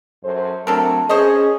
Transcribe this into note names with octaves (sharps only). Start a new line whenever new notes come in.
F#2 A4 C5
F#3 A3 C4 D4 A4 A#4
C#4 G#4 C5 C#5 D#5